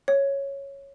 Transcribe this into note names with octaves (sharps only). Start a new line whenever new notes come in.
C#5